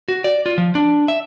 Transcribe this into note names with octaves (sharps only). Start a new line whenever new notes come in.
F#4
D5
F4
F3
D4
E5